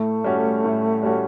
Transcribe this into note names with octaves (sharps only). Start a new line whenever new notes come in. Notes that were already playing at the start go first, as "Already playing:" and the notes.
Already playing: A2 A3
G3 C#4 F#4
A2
G3 C#4 F#4